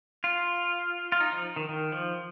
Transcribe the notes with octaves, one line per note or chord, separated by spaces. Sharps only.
F4
F4
D#4
F3
D#3
D#3
F3